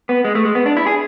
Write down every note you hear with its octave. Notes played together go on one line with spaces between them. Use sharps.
B3
G#3
A3
G#3
B3
D4
E4
G#4